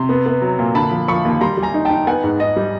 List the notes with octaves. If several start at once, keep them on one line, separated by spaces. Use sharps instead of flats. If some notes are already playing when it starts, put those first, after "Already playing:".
Already playing: C3 C6
B3
B3
F#3
A#2
D3 A5 B5
F3
F3 B5 C#6
D#2
G3 A#5 C6
G3
G#5 A#5
D#4
G5 A5
D#4
B3 F#5 G#5
G#2
G#2 D#5
G3